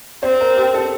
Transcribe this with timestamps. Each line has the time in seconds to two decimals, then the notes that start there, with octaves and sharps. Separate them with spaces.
0.23 C4 C5
0.41 A#4
0.57 G4
0.74 A4